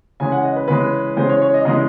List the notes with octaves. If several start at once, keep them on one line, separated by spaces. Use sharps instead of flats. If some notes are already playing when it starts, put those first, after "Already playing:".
C#3 E3 G#3 C#4 G#5
F#5
D#5
B4
C#3 E3 G#3 C#4 B4
C#3 E3 G#3 C#4 C5
C#5
C#5
D#5
C#3 E3 G#3 C#4 D#5